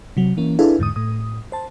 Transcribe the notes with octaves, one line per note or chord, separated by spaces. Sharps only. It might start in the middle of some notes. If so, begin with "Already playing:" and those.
C3 F#3
E3 A#3 C#4
D4 E4 G#4 A4 B4 F5
E2 G#2 D3 D#6
A2 D#6
C5 A5